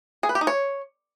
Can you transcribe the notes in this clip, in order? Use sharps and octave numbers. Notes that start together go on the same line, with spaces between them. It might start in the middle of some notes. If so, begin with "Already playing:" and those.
G#4
B4
G4
D#4
C#5